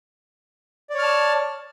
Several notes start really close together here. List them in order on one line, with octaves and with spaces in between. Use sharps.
D5 C#5 F6 A5